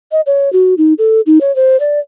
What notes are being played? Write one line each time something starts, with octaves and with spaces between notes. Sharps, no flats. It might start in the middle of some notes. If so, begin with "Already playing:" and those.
D#5
C#5
F#4
D#4
A4
D#4
C#5
C5
D5